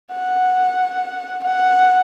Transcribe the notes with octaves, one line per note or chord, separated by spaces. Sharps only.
F#5
F#5